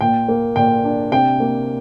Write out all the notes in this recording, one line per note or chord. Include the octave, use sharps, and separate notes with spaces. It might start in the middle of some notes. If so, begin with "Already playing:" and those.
A#2 G5
A#3
A#2 G5
D4
C3 G5
A#3